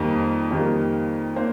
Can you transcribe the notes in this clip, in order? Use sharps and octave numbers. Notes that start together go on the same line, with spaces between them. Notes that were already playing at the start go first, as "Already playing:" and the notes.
Already playing: F2 D#3 G3 A#3
F2 D#3 G3 A#3
A#3 C5